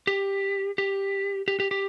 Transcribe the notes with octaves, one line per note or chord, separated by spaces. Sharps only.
G4
G4
G4
G4
G4